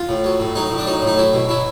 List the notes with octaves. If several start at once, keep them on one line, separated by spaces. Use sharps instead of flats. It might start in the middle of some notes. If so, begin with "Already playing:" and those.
Already playing: F4
A2
F#3
A2
F#3 D#4
A2
D4
F#3 D#4
A2 D#4
F#3 E4
B2
F#3 E4